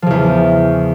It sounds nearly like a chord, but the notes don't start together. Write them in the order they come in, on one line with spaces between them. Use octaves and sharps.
F3 C#3 E2